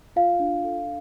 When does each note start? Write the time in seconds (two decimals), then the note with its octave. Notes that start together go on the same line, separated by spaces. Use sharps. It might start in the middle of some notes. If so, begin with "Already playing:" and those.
0.16 F4 F5
0.40 D4
0.64 A4